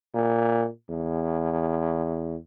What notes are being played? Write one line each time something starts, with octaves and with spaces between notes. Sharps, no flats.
A#2
E2